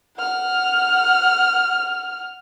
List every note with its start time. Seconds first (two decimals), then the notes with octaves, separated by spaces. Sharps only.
0.17 F#5 F6